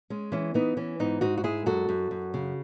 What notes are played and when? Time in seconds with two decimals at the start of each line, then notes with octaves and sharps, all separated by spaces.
0.10 G#3 C#4
0.32 E3 C#4
0.54 E3 B3 D#4
0.77 E3 C#4
0.99 G#2 B3 D#4
1.21 G#2 D#4 F#4
1.37 F#4
1.44 G#3 E4 G#4
1.66 F#2 F#4 A4
1.89 F#2
2.11 F#2
2.34 C#3